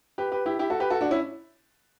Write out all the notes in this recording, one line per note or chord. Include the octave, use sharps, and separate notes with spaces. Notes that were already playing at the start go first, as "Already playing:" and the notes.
G4 B4
G4 B4
E4 G4
E4 G4
F#4 A4
G4 B4
F#4 A4
D4 F#4
C#4 E4